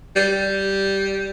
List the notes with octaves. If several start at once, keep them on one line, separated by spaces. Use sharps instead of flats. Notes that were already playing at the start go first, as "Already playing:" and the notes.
G3